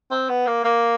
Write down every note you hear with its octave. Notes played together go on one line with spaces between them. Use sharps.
C4
B3
A#3
A#3